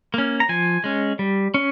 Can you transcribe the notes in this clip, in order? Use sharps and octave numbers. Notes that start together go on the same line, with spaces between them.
A#3 C#4
A#5
F3 G#5
G#3 C#4
G3
C#4